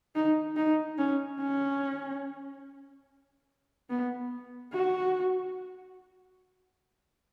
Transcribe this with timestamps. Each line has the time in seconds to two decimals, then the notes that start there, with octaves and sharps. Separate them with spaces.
0.15 D#4
0.57 D#4
0.98 C#4
1.40 C#4
3.90 B3
4.73 F#4